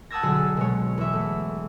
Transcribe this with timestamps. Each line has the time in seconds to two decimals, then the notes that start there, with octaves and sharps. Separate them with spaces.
0.10 F#5 A5 D#6 E6 G#6 A#6
0.23 B1 D3 F#3 G#4 G#5 E6
0.57 B2 G#3 C#5
0.98 E2 E5
1.13 A3